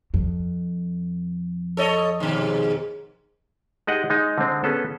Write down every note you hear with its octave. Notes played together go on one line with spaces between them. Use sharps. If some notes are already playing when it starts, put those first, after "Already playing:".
F2
A4 C#5 D#5
D#2 G#2 B2
G#3 D#4 G4 G#4 D#5 F#5
G#3 D#4
D3 G#3 C4
B3 C#4 G#4 A4